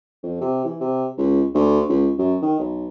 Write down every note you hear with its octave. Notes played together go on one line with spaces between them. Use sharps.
F2
C3
E3
C3
C#2
D2
C#2
F#2
D#3
B1